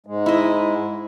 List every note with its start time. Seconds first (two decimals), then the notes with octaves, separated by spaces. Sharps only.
0.06 G#2 G#3
0.26 E4 D#5